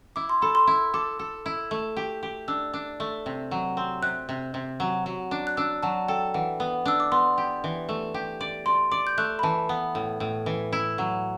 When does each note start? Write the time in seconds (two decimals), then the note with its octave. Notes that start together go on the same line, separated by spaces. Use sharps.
0.16 E4 D6
0.29 C6
0.42 A4 B5
0.55 C6
0.67 E4
0.94 A4 D6
1.19 A4
1.46 E4
1.71 A3
1.96 G4
2.23 G4
2.48 D4 E6
2.73 D4
3.00 A3
3.26 C3
3.51 F#3
3.77 C4
4.03 C3 F#6
4.29 C3
4.54 C3
4.80 F#3
5.06 F#3
5.31 D4
5.47 F#6
5.57 D4 E6
5.83 F#3 A5
6.08 A4 G5
6.34 E3 F#5
6.60 B3
6.85 D4 E6
7.00 D6
7.12 B3 C6
7.38 G4
7.64 E3
7.89 A3
8.14 G4
8.41 D5
8.66 D5 C6
8.91 D5 D6
9.07 G6
9.18 A3 F#6
9.39 B5
9.43 E3 A5
9.69 B3
9.95 A2
10.20 A2
10.46 E3
10.73 E4
10.98 F#3